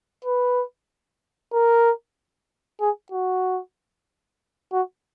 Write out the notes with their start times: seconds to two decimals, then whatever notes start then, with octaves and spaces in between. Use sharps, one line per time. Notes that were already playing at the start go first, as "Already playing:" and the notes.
0.25 B4
1.53 A#4
2.81 G#4
3.12 F#4
4.72 F#4